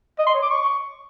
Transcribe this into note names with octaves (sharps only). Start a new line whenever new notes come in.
D#5
C6
C#5
D6
C#6